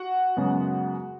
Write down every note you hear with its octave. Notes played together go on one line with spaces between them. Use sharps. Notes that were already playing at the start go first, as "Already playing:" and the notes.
Already playing: F#4 F#5
F#2 C#3 G#3 B3